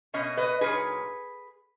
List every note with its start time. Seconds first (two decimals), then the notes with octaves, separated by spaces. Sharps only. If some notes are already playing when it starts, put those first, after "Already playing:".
0.14 B2 A#3 C#4 D#5
0.37 B4 D#5
0.61 A#2 F#3 A#3 D#4 G#4 B4